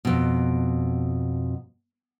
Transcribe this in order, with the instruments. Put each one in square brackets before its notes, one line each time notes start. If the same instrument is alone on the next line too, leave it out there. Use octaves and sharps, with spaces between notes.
[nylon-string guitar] F2 B2